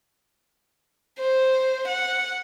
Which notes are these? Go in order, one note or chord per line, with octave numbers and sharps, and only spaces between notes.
C5
F#5